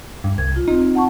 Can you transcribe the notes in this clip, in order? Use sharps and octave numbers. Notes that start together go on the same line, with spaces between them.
G2
C2 G#6
F4
C4 D#4 F4
F#5 A5 C#6